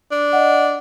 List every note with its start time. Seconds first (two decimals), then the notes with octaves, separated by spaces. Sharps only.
0.11 D4
0.33 D#5 F#5